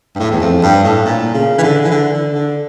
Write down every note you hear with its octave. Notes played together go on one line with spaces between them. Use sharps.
G2
A2
E2
F2
G2
A2
A#2
C#3
E3
D3
E3
D3
D3
D3